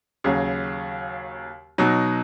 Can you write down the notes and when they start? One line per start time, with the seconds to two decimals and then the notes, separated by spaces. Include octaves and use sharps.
0.24 D#2 C#3 F#3
1.78 B2 F#3 D#4